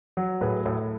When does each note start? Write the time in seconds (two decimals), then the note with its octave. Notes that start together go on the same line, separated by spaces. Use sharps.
0.17 F#3
0.41 A2 G#4 B4
0.66 A2